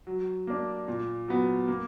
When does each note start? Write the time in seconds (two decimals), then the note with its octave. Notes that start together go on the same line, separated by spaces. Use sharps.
0.07 F#3
0.47 A#3 D4
0.88 A#2
1.28 F#3 B3
1.68 A#3